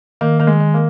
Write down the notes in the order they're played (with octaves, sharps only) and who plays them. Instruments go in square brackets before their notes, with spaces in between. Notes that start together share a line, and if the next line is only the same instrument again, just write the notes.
[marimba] D#3 [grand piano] A#3
[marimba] D#3 [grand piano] A#3
[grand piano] G#3
[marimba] D#3
[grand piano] A#3